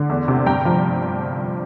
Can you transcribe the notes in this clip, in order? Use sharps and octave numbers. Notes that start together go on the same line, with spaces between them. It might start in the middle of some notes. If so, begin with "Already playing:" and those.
Already playing: D3
E2
C3
G2 G5 A#5
F3